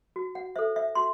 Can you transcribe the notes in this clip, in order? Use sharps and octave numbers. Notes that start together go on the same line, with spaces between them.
F#4
F#5
A4 C5 E5
E5
F#4 C6